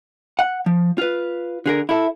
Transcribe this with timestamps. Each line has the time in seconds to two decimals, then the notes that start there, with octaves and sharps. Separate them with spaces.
0.39 F#5
0.66 F3
0.98 F4 B4
1.66 D3 G#4 A#4
1.89 E4 A4